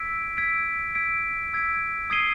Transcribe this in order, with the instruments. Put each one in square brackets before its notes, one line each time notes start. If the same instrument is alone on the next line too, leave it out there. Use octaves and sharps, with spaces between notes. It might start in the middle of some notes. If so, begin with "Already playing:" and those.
Already playing: [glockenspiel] E6 G#6 B6 D7
E6 G#6 B6 D7
E6 G#6 B6 D7
E6 G#6 B6 D7
D#6 G#6 C7 D#7 G7